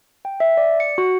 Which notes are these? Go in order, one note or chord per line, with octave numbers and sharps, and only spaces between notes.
G5
E5
D5
C#7
F#4